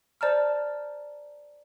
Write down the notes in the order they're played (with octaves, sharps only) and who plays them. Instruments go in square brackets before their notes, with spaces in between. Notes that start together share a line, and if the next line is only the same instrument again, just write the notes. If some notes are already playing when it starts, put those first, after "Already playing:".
[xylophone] C5 D5 A5 A#5 F6